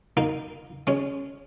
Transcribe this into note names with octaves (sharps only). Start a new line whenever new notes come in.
A#3 D#4
G#3 C#4